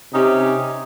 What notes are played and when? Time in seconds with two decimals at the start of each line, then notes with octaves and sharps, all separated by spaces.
0.14 C3 C#4 D#4 G4